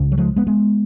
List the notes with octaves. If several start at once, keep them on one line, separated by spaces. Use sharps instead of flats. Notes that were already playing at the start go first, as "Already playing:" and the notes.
Already playing: C#2 C#3
F#3
F3 G#3
G#3 B3
G#3 B3